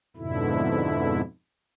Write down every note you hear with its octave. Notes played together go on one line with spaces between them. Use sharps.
F2 G#2 B2 D3 E4